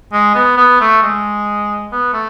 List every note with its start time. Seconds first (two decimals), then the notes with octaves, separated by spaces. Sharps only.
0.13 G#3
0.35 B3
0.58 B3
0.81 A3
1.02 G#3
1.92 B3
2.13 A3